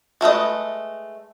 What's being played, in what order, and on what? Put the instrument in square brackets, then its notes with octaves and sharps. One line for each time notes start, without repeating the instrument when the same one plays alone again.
[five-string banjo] G#3 A3 B4 D#5